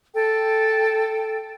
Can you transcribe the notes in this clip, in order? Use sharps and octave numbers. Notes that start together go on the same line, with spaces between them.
A4 G5